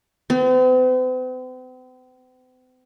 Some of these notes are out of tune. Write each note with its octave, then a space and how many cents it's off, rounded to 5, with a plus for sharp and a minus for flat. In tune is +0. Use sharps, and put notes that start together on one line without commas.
C4 -45